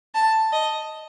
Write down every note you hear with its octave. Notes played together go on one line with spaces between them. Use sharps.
A5
D#5